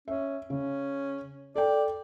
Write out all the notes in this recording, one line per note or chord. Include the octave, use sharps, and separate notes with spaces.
C#4 E5
C#3 C#4
A4 D5 G5